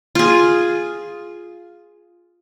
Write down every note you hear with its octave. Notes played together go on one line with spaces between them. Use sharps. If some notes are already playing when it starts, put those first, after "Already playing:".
F4 G#4